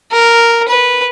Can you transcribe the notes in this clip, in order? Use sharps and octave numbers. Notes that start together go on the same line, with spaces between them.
A#4
B4